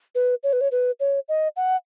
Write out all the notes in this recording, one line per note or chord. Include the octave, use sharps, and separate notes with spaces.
B4
C#5
B4
C#5
B4
C#5
D#5
F#5